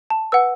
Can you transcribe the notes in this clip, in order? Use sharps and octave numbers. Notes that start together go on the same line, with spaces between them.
A5
B4 F#5 E6